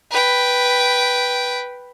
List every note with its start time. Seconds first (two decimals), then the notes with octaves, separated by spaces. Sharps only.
0.11 B4 G5